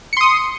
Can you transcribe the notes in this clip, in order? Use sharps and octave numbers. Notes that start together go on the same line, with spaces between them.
C6 D#6 C#7